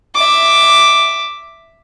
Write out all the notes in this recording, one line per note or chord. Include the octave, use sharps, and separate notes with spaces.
E5 D6